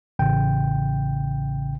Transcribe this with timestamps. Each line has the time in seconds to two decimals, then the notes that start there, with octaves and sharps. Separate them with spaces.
0.19 A1 C#3 G5